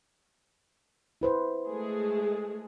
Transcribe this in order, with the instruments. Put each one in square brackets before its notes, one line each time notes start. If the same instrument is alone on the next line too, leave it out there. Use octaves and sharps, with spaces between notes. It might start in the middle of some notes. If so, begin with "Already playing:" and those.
[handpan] E4 B4 C5
[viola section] G#3 A3 G#4